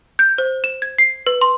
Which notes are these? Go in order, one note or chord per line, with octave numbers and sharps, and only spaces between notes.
G6
C5
E7
G#6
C7
B4
C6